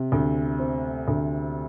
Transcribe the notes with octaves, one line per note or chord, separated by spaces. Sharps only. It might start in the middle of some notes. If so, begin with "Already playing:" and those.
Already playing: C3
D2
C4
D2